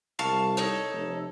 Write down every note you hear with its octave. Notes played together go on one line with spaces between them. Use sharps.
C2 F5 A5 C#6
D#4 A4 C#5
F1